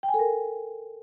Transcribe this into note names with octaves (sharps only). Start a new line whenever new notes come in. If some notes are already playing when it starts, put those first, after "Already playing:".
G5
G#5
A4
A#4